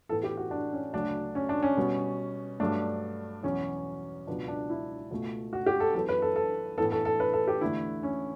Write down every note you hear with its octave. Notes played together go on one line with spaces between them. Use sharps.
A2 E3 B3 A4
G4
F#4
D4
C#4
D2 C#3 F#3 A3 D4
C#4
D4
C#4
B2 G3 B3
G2 F#3 A3 D4
E2 B2 F#3 C#4
C#2 B2 F#3 B3 D4
D4
E4
C#2 B2 A3
F#4
G4
A4
F#2 E3 B3 A4
B4
A4
A4
A2 E3 B3 A4
A4
A4
B4
A4
G4
E2 D3 A3 E4
C#4